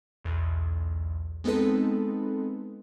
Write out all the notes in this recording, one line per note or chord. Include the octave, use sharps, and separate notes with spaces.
B1 E2
G#3 B3 C4 D#4 A4 B4